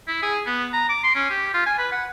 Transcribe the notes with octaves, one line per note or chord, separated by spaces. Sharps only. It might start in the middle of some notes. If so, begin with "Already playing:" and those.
E4
G#4
B3
A#5
D6
C6
C#4
G4
F4
G#5
B4
F#5